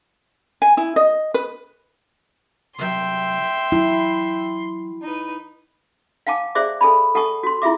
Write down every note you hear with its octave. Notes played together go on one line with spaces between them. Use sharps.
G#5
E4
D#5
B4
C2 F#3 E5 G5 C6
F#3 E4
D#4 B4
F5 F#5 G#5 A5 D6
G#4 C5 D5 E5 D6
A4 G#5 A5 B5
A4 F#5 G#5 A5 C#6 D#6
F#4 C6
E4 F4 G#4 E5 D6